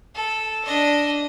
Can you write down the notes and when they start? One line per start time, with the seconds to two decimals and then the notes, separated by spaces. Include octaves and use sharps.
0.15 A4
0.65 D4 D#5